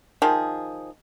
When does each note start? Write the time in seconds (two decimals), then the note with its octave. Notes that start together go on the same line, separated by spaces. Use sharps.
0.22 D#3 F3 G#4